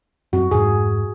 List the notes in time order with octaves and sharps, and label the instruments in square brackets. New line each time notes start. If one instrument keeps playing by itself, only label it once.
[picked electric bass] F#2 C4 [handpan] F#4
[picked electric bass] F2 G#2 [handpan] G#4